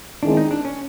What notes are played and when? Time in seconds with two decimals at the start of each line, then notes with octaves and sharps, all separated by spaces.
0.23 D#3 G#3 C4 D4 E4 G#4
0.37 D#4
0.51 D4
0.65 C#4